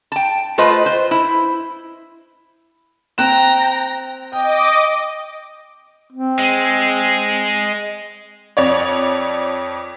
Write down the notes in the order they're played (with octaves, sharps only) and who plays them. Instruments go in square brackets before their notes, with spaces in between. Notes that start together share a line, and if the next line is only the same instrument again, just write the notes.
[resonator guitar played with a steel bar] G5 A5
A3 F4 B4 C5 D#5
C5
E4
[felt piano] C4 F#6 E7 [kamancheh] G5 A#5
[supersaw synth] D#5 D6 [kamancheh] G5
[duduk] C4
[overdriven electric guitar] G#3
[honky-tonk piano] F2 C#5 D5